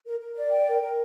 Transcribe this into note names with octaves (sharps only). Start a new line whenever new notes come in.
A#4
A#4
D5
G5
A#4
A#4